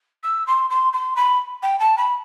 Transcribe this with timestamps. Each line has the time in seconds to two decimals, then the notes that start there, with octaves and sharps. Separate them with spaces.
0.23 E6
0.47 C6
0.70 C6
0.93 C6
1.16 B5
1.63 G5
1.80 A5
1.98 B5